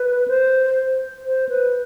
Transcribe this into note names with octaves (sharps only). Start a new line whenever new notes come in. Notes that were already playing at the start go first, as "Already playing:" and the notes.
Already playing: B4
C5
C5
B4